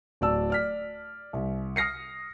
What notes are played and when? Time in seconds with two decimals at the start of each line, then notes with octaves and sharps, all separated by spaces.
0.21 D1 F#4 D5 A5 E6
0.50 D5 F6 B6
1.33 C2
1.76 D#6 F6 A#6 C7 C#7